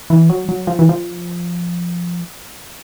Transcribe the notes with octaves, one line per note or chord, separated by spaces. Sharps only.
E3
F#3
F#3
F3
E3
F3